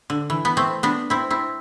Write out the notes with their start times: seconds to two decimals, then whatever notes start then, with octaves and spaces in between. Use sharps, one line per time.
0.10 D3
0.30 E3
0.45 B3
0.57 A3 C4
0.83 B3 D4
1.10 C4 E4
1.31 C4 E4